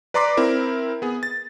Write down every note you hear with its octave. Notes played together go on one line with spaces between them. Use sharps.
B4 D5 A#5 C6 D6 B6
C4 E4 A#4
B3 G#4
A6